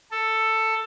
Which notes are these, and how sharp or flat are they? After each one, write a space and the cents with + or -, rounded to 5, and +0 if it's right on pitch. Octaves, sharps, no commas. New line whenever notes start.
A4 +10